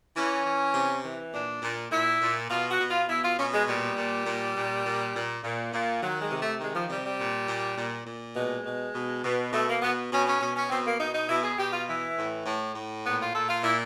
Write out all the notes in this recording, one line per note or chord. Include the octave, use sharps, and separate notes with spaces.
E3 C#4
E3
C3
E3
A#2 D4
A#2
A#2 E4
A#2
B2 F4
F#4
B2
F4
B2 E4
F4
B2 C#4
G#3
A#2 G3
A#2
A#2
A#2
A#2
A#2
A#2
A#2
D#3 F#3
G#3
C3
A3
D#3 G#3
F3
C3 G3
G3
A#2
A#2
A#2
A#2
B2 G#3
B2
B2
B2
B2 A3
A#3
B2 B3
B2 C#4
C#4
B2 C#4
C#4
B2 C4
A#3
B2 D#4
D#4
B2 E4
G#4
B2 G4
F4
E3 E4
A2
A2
A2
A#2 B3
F4
A#2 A4
F4
A#2 E4